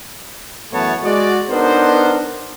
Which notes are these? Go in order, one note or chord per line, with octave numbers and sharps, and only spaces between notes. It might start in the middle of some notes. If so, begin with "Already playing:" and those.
F#2 E3 A3 B3 C#5 A5
G#3 F#4 D5
B3 D4 D#4 A#4 C5